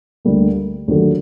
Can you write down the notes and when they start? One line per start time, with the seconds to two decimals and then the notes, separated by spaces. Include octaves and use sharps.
0.25 D2 D3 G3 A#3
0.88 D#2 D3 F#3 A3